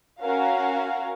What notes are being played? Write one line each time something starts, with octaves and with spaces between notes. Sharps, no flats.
C#4 F#4 A#4 F5